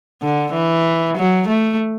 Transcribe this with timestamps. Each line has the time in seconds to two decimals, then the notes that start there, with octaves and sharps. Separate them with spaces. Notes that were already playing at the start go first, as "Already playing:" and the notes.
0.22 D3
0.53 E3
1.17 F#3
1.48 A3